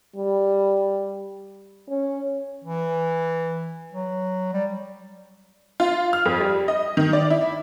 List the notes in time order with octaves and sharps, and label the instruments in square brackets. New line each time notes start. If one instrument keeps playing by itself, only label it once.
[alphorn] G3
C#4
[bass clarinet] E3
F#3
G3
[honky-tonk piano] F4
F6
F2
G3
D#5
D#3
D5
E4